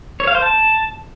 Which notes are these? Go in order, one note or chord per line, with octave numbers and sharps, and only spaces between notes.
C#5
F5
C5
A5